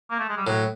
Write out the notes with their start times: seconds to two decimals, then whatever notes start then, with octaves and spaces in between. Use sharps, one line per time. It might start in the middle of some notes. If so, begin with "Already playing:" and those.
0.10 A#3
0.19 A3
0.29 G#3
0.37 G3
0.46 A2 F#3